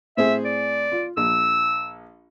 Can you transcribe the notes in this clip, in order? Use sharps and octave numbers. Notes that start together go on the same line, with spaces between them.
A2 C4 G#4 E5
D5
F4
A#1 E6